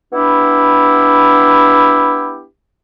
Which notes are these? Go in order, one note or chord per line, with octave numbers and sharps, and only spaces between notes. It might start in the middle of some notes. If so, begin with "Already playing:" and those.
B3 D4 E4 G4